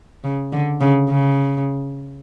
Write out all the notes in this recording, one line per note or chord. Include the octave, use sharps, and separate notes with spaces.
C#3
D3
C#3
C#3